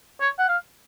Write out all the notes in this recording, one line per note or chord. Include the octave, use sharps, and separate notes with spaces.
C#5
F#5
F5